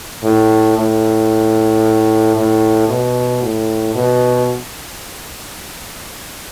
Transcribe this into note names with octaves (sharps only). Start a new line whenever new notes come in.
A2
A2
A2
B2
A2
B2